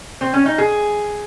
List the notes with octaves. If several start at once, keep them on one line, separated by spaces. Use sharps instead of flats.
C4
C#4
D#4
G#4